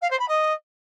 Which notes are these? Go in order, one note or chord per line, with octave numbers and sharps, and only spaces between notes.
F5
C5
B5
D#5